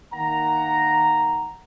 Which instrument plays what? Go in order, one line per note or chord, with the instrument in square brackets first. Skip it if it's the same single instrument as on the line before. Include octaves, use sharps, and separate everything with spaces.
[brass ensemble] D#3 A#3 F#5 A#5